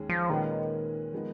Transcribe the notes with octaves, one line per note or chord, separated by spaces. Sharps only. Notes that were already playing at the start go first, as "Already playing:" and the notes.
Already playing: D#2 D#3 G#3 C#4 G#4
F3
A#2 D#3 G#3 C#4 F4 B4
F3 G#3 B3 D#4